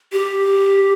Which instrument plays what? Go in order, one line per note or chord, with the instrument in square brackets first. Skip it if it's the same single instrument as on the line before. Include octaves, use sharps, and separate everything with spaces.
[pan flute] G4